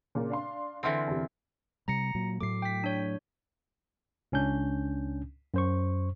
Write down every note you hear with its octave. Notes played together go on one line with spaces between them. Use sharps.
A#2 C#3 A#4
D4 F5 C6
D3 E3 C4 F#5 C6 F6
E2 C3
C3 G3 A#5 A#6 C#7
A#2 F#3
A2 F#3 A3 D6 C7
G5 B6
D4 C#5
C#2 C#4 D4 G6
F#2 C5 C#6